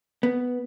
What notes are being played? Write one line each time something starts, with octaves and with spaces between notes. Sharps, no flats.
B3